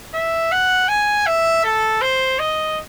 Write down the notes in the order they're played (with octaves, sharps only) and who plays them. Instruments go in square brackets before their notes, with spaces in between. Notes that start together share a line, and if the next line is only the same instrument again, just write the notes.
[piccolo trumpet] E5
F#5
G#5
E5
A4
C5
D#5